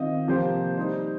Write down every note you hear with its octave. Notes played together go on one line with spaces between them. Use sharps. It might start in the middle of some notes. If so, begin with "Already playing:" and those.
Already playing: D#3 C4 F4 D#5
C3 F3 A#3 G4 C5
G3 D#4 C5